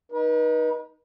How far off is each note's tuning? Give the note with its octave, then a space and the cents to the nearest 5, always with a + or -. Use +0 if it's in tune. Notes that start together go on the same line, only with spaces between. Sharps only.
D#4 +0 B4 -40